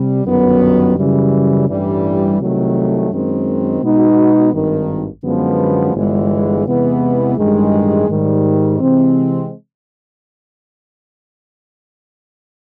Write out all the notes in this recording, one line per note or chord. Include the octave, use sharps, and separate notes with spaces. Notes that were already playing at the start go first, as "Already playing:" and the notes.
Already playing: C3 G3
G1 F#2 D#3 F#3 B3
F#2 C#3 E3 G3
A1 G2 E3 G3
C2 C3 D#3 F#3 A3
F#2 D#3 G#3 C4
B2 G#3 B3 D#4 F#4
G#1 G2 D#3
F#2 D3 F3 G#3 B3
G1 G2 E3 G#3 B3
E2 C3 E3 G#3 B3
A1 G2 D#3 G#3
G#2 D#3 G3
C3 E3 G#3 C4